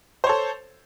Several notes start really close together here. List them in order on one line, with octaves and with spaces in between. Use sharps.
C5 C#5 A4